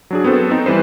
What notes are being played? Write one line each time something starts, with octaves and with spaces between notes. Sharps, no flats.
F#3 D4 G#4
B3 C4 F#4 A4 C5
C4 D#4
E3 G3 B4 C5